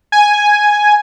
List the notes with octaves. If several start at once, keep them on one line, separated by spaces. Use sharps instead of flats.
G#5